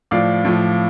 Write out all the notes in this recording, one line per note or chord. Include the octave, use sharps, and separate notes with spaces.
A2 F3 D5 F5
A2 F3